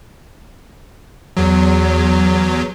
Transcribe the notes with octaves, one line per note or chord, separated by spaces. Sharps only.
E2 F#3